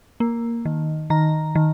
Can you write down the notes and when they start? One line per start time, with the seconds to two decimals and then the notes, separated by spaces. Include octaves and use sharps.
0.20 A#3
0.65 D#3
1.10 D#3 A#5
1.55 D#3